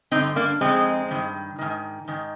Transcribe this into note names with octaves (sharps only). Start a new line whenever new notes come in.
G2 D3 C4 D#4
A#3 D4
F2 D#3 G#3 C4
G2 D#3
G#2 D#3
G#2 D#3